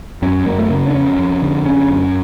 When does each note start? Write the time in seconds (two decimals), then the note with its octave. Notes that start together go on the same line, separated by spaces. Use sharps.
0.22 F#2 C#4
0.46 F#2 A#3
0.58 A3
0.70 C#3 A#3
0.88 D4
0.94 F2 C#4
1.18 F2
1.42 D3
1.66 F#2 C#4
1.90 F#2